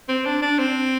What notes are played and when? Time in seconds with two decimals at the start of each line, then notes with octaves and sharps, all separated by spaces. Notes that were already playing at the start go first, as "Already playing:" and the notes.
0.08 C4
0.25 D4
0.42 D4
0.59 C4